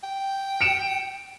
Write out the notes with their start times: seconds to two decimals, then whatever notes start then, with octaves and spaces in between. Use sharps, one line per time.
0.04 G5
0.61 C#7 D7 E7